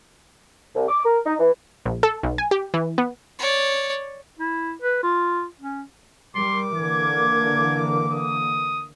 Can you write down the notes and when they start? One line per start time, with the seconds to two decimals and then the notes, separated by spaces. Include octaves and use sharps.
0.75 C2
0.89 D6
1.05 A#4
1.26 D#4
1.39 E3
1.86 A#1
2.03 A4
2.23 B1
2.38 G#5
2.51 G4
2.74 E3
2.98 B3
3.39 C#5 D5
4.39 E4
4.82 B4
5.03 F4
5.60 C#4
6.35 G3 A#4 C6 D6
6.77 D3 E3 A#3 G#6
8.12 D#6